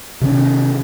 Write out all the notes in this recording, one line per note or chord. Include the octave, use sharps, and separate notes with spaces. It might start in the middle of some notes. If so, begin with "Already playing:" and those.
C3 D#3 C#4